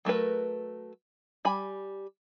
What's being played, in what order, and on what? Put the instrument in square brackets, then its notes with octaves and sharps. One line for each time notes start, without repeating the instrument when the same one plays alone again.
[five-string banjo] F#3 A3 A#4 B4
G3 G#5 B5